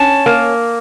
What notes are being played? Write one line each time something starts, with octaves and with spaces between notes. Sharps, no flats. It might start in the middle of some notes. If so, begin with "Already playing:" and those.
Already playing: C#4 A5
A#3